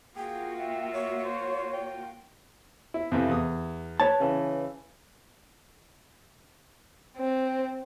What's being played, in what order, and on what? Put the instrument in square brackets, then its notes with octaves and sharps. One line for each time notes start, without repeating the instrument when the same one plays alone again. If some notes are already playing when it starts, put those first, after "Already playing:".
[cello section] A#3 F4 F#4 [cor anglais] G#4 [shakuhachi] G5
[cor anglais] E5
[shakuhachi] C#5
[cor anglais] C5
G5
[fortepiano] E4
F2 C3 E3
E2 D#6
[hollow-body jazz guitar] B4 C#5 A5
[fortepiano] C#3 E3
[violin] C4